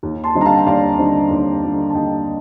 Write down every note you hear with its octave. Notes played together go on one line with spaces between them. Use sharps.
D#2
A5 C6
D3 G3 C4 D#4
A#5
F5 A5
G5
D#2 D5 F5
D3 G3 C4 D#4
D#2
D3 G3 C4 D#4
A5
D#2 D#5 G5